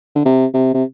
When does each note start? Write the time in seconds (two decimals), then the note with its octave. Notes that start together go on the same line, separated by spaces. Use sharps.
0.15 D3
0.25 C3
0.54 C3
0.74 C3